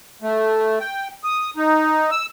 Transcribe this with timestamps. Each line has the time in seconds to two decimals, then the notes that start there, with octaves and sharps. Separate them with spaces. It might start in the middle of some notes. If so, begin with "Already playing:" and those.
0.22 A3
0.81 G5
1.24 D#6
1.57 D#4
2.11 E6